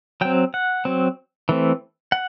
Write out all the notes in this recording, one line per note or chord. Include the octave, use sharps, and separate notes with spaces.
F#3 C4 G5
F#5
F#3 C4
E3 A3 C4
F#5